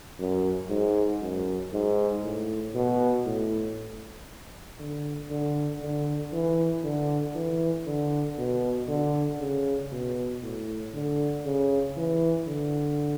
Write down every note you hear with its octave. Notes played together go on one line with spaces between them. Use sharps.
F#2
G#2
F#2
G#2
A2
B2
A2
D3
D3
D3
E3
D3
E3
D3
B2
D3
C#3
B2
A2
D3
C#3
E3
D3